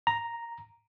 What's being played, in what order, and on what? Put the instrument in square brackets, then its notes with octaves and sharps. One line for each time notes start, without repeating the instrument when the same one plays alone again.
[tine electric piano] A#5